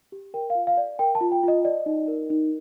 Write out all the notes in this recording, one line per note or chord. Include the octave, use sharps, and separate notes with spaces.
G4
A#4 G5
F5
F4
F5
D5
A#4 G5
A5
F4
G5
F4 D#5
D5 D#5
D#4
A#4
D#4